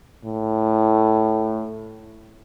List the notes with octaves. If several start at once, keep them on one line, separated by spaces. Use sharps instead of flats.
A2